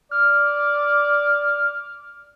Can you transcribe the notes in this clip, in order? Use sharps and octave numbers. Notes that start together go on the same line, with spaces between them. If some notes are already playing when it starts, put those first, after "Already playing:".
D5 F6